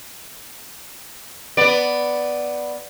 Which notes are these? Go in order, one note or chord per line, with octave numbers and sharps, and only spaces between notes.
B3 D5